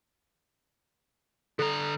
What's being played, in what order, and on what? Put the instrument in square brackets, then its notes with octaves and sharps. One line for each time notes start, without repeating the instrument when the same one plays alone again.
[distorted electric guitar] D3 A#5 [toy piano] A4